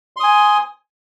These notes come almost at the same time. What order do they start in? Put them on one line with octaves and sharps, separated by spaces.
C6 D#6 G#5